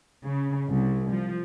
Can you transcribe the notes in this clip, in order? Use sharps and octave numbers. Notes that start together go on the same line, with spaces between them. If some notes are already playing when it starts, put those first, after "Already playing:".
C#3
C2
F3